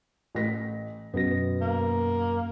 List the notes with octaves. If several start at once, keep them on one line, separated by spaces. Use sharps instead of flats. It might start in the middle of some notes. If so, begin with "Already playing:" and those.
A1 A#6 B6
F#2 B2 B3 A#6
A#3